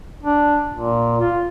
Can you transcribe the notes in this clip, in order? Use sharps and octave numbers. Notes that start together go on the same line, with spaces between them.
D4
A#2
F4